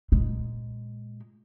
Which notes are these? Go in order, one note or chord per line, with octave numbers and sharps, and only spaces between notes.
A#2 G#3